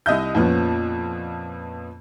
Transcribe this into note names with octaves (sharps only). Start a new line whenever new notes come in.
C2 D#5 E5 G6
F2 A#2 F3 B3 C#4